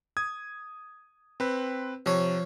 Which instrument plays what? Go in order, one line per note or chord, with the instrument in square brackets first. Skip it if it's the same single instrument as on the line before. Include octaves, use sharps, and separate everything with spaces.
[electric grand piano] D#6 G#6
C4 B4
[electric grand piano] C3 [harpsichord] F3 C#5